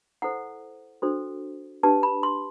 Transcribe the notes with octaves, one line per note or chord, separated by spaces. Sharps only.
E4 A4 C5 F#5
D4 F#4 A4 C5
D4 G4 B4 A5
B5
C6